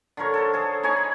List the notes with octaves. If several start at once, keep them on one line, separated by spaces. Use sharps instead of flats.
D3 F4 A#4 C#5
A4 C5
G#4 A4
D#4 G#4 C#5 G#5
B5